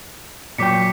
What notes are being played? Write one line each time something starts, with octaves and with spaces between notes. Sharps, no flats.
A#2 F#3 G5 D6 B6 C#7